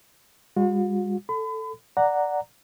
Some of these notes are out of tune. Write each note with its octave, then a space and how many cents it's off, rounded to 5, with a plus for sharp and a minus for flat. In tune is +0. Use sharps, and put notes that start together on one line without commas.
G3 +45 F#4 -45
A4 +5 B5 +35
D5 +0 F#5 +0 A#5 -10